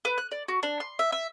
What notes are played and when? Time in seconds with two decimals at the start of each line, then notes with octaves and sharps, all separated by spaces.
0.05 B4
0.18 F#6
0.31 D5
0.48 F#4
0.63 D4
0.80 C6
0.99 E5
1.12 E5